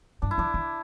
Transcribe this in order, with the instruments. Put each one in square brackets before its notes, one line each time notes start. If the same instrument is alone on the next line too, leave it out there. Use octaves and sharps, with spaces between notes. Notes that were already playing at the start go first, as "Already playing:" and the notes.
[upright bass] G2 [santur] D4
[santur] E4
[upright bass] F3 [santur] D4
[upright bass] E3